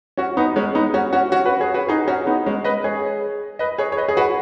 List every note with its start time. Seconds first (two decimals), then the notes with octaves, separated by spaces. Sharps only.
0.17 C#4 F#4
0.37 B3 D#4
0.56 G#3 C#4
0.75 B3 D#4
0.94 C#4 F#4
1.13 C#4 F#4
1.32 C#4 F#4
1.45 F#4 B4
1.60 G#4 C#5
1.74 F#4 B4
1.89 D#4 G#4
2.08 C#4 F#4
2.26 B3 D#4
2.46 G#3 C#4
2.64 B4 D#5
2.84 G#4 C#5
3.59 B4 D#5
3.78 G#4 C#5
3.92 C#5
3.97 B4 D#5
4.09 G#4
4.17 F#4 B4